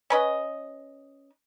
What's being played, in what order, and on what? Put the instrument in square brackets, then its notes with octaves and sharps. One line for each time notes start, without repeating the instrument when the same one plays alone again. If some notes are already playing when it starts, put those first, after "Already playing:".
[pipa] C#4 B4 D#5